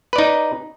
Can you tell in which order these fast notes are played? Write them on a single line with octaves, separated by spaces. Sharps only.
B4 D5 D#4